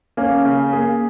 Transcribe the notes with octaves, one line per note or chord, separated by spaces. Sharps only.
A#3 C#4
C#3
A#3 G#4